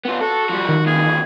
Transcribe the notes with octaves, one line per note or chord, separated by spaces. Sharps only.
B3 F4
F#4 A4
F3 G3
D#3
E2 A#2 G#4